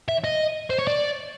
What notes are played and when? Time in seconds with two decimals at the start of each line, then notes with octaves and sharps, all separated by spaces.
0.09 E5
0.24 D#5
0.70 C5
0.79 C#5
0.87 D5